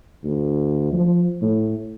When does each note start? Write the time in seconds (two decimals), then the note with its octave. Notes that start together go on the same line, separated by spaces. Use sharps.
0.24 D2
0.92 F3
1.41 A2